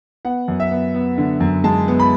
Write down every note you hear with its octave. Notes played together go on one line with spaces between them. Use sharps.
B3 F#5
F#2
E5
B3
B3
D3
F#2
G#3 A5
B3
B5